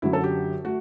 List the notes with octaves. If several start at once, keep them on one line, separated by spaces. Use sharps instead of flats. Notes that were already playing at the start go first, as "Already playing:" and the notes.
F#2 D3 F#3 E4
A4
G4
A3 F#4